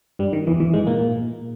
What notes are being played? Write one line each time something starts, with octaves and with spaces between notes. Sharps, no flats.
G2 G3
D#3
E2 E3
E2 E3
G#2 G#3
A#2 A#3